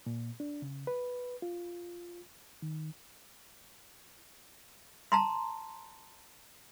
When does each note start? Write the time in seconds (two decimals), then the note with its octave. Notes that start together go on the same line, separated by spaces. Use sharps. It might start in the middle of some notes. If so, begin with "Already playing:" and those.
0.06 A#2
0.40 D4
0.62 C#3
0.87 B4
1.42 F4
2.62 D#3
5.12 A5 A#5 C6